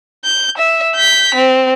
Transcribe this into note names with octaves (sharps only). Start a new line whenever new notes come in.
G6
E5
G6 B6
C4